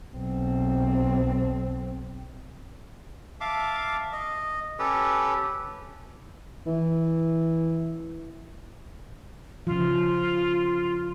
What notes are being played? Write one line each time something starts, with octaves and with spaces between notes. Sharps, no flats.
B1 C4
E5 F5 A5 D6
D#5
C#4 G4 A4 B4
E3
C#3 F3 F4